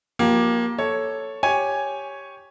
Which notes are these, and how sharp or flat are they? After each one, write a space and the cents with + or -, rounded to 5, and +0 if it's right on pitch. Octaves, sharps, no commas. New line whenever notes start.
F3 +40 A#3 +20 G4 +0
A4 +0 C#5 +0 A5 +0
G4 +0 C#5 +0 G#5 +0